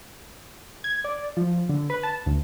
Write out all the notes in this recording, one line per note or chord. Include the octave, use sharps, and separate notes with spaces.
G#6
D5
F3
D3
B4
A5
D2